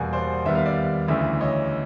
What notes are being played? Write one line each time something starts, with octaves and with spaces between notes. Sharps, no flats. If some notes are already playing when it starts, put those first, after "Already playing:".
Already playing: E2 B2 G3 A#3 F#5 G#5
C5 D5
D#2 D#3 G3 B3 E5
F5
D5 E5
D2 C#3 E3 A3 D5 E5
C#5 D#5